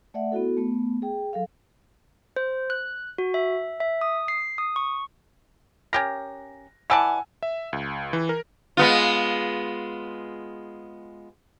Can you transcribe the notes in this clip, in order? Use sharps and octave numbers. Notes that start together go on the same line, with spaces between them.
A3 D5 E5 F#5
B3 E4 F#4 A4
A3 B3
G#4 G5
F#3 A4 F5
C5
F#6
F#4
E5
E5
D#6
C7
D#6
C#6
C#4 G4 A#4 A#6
E3 D5 F#5 G#5 A5 E6
E5
C#2
E3
A#4
G#3 B3 F4